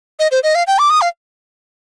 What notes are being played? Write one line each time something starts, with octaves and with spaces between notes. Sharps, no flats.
D#5
C5
D#5
F5
G5
D6
D#6
F5